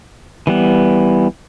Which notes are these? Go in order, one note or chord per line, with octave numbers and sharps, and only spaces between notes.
E3 G3 B3